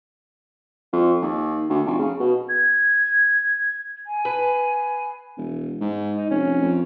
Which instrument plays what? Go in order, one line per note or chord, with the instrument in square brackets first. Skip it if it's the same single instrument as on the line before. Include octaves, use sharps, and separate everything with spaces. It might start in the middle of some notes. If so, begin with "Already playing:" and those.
[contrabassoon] F2
D#2
D2
F1
C#3
B2
[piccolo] G#6
[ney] G#5
[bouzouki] B4
[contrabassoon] E1
G#2
[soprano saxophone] D#4
[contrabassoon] F1 [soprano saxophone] C#4
[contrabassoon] F2